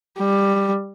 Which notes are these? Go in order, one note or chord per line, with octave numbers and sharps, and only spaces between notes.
G3